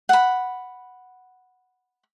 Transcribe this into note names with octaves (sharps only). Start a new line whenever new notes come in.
F#5 B5